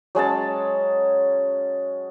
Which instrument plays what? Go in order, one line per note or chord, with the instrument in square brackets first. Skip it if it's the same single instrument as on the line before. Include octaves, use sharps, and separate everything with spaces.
[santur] F#3 G#3 C#4 A5